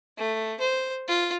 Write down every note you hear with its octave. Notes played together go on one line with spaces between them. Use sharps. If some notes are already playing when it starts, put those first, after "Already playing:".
A3
C5
F4